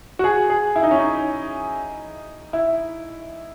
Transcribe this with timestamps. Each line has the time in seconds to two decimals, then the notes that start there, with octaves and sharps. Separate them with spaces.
0.19 F#4
0.24 G#4
0.50 G#4
0.76 E4
0.83 D#4
0.91 C#4
0.99 D#4
2.53 E4